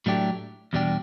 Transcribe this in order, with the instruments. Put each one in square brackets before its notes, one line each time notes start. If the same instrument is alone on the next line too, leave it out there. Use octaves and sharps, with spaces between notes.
[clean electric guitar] A2 F#3 A3 D4 G4
E2 B2 G3 D4 G4